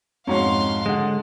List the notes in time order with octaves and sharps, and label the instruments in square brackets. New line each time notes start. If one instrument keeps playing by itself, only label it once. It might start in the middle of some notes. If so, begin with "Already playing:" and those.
[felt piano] F2 G#2 [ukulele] C#4 F#4 C#5 [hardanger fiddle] F5 C6
[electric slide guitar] D3 G#3 [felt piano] D#5 F#5